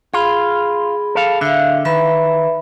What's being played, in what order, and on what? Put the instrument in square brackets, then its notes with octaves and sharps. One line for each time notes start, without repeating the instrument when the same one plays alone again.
[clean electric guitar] F4 [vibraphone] G#4 B5
[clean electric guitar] A4 F5
[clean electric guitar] D3 [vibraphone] E5 F5
[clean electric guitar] D#3 [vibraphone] B4 E5 B5